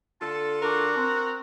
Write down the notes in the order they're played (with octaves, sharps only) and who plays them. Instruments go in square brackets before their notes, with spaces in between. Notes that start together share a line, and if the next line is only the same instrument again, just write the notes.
[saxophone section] D3 F4 A4 [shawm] A5
[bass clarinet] D4 [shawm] F#4 [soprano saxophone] A#4
[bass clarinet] C4